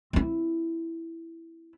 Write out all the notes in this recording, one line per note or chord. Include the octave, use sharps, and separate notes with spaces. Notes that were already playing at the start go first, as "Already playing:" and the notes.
C4 E4